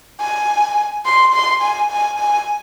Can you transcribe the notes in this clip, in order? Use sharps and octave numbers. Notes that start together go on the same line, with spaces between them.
G#5
C6
C6
G#5
G#5
G#5